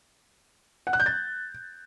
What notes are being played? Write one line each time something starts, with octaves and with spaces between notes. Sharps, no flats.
F#5
F#6
G6
A6